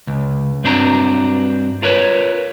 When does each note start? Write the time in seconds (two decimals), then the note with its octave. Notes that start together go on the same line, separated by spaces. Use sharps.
0.07 C#2
0.64 G2 C4 D4 E4 F#4 A#5
1.82 F4 A#4 B4 C#5